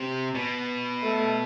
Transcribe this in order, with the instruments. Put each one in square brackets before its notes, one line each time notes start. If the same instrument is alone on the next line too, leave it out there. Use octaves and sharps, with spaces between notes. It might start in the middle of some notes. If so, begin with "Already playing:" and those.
Already playing: [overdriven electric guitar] C3
B2
[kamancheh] A3